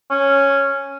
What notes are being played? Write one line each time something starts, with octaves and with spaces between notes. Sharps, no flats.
C#4